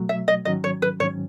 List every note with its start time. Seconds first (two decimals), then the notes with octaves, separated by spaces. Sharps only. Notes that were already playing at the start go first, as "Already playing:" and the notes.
Already playing: B2 F#3 A3
0.09 E5
0.28 D#5
0.45 G#2 D#3 F#3 C#4 D#5
0.64 C#5
0.82 B4
1.00 G#2 D#3 F#3 C#4 C#5